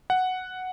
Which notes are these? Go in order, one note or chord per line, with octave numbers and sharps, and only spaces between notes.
F#5